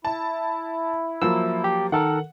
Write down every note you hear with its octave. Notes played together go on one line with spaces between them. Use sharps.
E4 A5
F3 F#3 A#3 E6
G4
D#3 A4 A#4 F#5